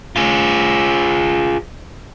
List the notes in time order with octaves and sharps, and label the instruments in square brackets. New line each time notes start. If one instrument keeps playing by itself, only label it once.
[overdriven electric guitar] F4 G#4